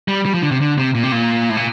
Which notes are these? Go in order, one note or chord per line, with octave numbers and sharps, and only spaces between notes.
G3
G3
F3
D3
C3
D3
C3
A#2
C3
A#2
A2
A#2